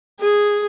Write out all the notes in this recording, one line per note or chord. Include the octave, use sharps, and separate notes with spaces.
G#4